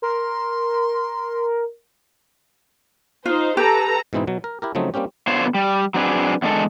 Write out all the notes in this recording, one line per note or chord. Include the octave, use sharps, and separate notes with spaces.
A#4 C6
D#4 F4 C5
G4 A4 B4 A#5
G#2 B2 E3 C4 D#4 E4
B2 F#3
A#4
E4 G4 A#4
C#3 F3 F#3 A3 C4 D#4
G3 A#3 C4 C#4 G4
D3 B3 F4 C5 C#5
G3
F#3 C4 D4 G#4 B4
E2 D3 G#3 A4